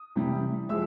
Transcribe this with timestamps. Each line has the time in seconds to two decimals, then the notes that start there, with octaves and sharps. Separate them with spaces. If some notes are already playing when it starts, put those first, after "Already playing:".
Already playing: D#6
0.16 C3 E3 G3
0.69 F3 G#3 E5 E6